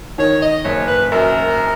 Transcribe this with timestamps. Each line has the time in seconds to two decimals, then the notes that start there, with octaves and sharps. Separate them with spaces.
0.18 D#3 C#5
0.42 D#5
0.65 F#1 C#5
0.88 B4
1.12 F#2 A#4